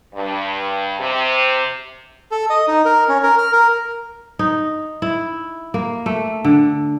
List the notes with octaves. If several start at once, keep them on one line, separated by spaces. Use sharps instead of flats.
G2
C3
A4
D#5
D#4
A#4
C#4
A#4
F6
A#4
D#4
E4
A#3
A3
D3